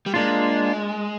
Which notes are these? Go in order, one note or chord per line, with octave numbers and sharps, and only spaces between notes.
G3
G#3 A#3 D4 F4